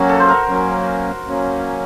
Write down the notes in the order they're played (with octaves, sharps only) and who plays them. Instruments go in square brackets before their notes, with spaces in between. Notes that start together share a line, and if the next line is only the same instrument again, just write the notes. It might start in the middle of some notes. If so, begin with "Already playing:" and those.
Already playing: [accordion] F#3 A#3 C#4 [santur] F#4
[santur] A4
C5
A#4
[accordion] F#3 A#3 C#4
F#3 A#3 C#4